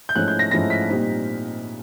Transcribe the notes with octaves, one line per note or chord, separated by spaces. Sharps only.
G6
G#2 F3 A3 C#4 E4 F#6
G6
A#6
G#2 F3 A3 C#4 E4 A#6
B6
A#2 G3 C4 D#4